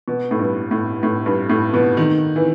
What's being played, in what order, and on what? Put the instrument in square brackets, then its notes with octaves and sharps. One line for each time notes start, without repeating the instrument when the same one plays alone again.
[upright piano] B2
A2
G2
A2
A2
G2
A2
B2
D#3
E3